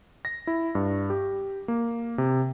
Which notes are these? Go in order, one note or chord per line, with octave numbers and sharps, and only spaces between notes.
A#6
E4
G2
G4
A#3
C3